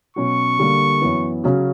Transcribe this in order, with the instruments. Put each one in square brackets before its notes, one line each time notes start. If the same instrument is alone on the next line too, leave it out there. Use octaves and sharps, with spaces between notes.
[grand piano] B2 F#3 C#4 F#4 [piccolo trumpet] C#6
[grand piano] D3 G3 A#3
F#2 E3 B3
C#3 F#3 C#4 F#4